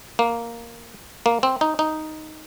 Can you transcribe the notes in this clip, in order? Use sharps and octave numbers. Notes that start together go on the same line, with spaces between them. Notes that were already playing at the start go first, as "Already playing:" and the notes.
A#3
A#3
C4
D#4
D#4